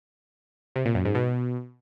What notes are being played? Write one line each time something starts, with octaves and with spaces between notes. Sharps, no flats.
C3
A#2
F#2
G#2
B2